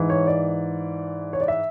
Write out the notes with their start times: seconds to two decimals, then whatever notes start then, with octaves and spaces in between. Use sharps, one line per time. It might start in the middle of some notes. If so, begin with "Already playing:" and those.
Already playing: G#2 E3
0.10 C#5
0.27 D5
1.33 C#5
1.41 D5
1.48 E5